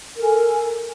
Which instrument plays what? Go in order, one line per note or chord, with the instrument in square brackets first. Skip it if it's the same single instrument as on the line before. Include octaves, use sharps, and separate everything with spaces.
[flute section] A#4
A4
G#5